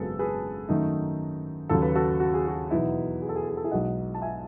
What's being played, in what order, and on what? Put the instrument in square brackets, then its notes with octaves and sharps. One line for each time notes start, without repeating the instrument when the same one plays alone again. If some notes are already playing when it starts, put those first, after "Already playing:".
Already playing: [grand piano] G#1 F#2 C#3 F#3 B3 G#4 A4 B4
G#4 B4
F#2 D#3 A3 D#4
D#2 C#3 F#3 A4
B4
F#4 A4
F#4
G#4
F#4
E2 B2 F#3 B3 D#4 E4
G#4
A4
G#4
A4
G#4
A4
E4 G#4
B1 B2 G#3 D#4 D#5 F#5
A5
E5 G#5